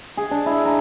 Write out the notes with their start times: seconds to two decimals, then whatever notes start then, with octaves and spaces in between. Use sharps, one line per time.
0.17 G#4
0.31 D4
0.46 E4
0.65 A#5